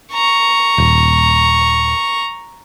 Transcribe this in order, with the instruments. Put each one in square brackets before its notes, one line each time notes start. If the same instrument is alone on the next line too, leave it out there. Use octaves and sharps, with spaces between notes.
[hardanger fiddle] A#5 C#6
[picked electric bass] D#1